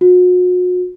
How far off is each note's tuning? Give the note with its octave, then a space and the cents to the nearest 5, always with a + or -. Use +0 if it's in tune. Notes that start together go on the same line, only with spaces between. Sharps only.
F#4 -40